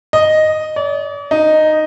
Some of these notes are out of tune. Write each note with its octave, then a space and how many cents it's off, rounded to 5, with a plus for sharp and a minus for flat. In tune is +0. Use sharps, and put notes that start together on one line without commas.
D#5 -5
D5 -45
D#4 -5